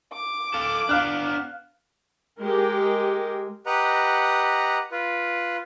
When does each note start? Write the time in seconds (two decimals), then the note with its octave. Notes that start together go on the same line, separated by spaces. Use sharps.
0.13 D6
0.54 A4 F5
0.89 B3 D4 F5 F6 F#6
2.40 G#3 G4 A#4
3.66 G4 B4 D#5 F#5 A#5
4.92 F4 B4